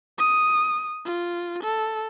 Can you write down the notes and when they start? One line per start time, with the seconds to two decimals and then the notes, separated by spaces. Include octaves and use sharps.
0.18 D#6
1.05 F4
1.63 A4